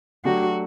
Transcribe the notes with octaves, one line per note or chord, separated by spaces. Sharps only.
F#3 A3 D4 F#4 G4